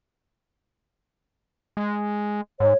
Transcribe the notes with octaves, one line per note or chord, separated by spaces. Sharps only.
G#3
G#2 C#5